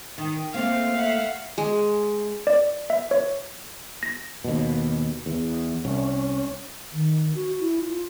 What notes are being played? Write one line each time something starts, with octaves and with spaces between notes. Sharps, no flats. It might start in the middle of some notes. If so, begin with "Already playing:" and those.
D#3
A3 A#3 C4 F5
E5 F#5
G#3
D5
E5
C#5
A#6
D#2 B2
E2
C2 C#4
D#3
F#4
E4
F4